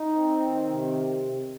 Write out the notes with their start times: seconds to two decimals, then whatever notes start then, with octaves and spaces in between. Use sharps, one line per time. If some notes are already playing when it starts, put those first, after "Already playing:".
Already playing: D#4
0.13 C4
0.40 D#3
0.68 C3